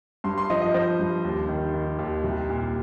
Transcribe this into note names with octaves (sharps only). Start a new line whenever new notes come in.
G2 C6
C6
F3 D#5
D#5
F3 C5
G2
D#2
D#3
D#3
D#2
C2
A#2